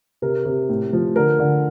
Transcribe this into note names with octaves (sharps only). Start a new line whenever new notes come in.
C3 A#4
C3
A2
F3
D3 A#4
D3